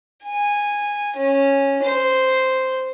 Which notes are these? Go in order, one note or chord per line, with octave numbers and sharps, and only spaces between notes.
G#5
C#4
C5